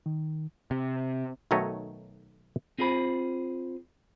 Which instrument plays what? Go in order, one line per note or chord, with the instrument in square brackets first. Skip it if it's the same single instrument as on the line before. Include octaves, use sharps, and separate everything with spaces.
[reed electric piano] D#3
[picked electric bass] C3
[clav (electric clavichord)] B1 D#3 F#3 A3 C#5 D#5
[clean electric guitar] C4 F4 G#4 C5 B5